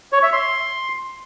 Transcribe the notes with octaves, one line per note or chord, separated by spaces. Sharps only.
C#5
E5
C6